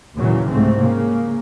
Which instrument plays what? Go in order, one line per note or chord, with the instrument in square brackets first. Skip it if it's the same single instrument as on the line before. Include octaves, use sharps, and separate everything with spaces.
[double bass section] D#2 A#2 C#3 E3 F#3
C2 G#2 A3 C4
C#3 A#3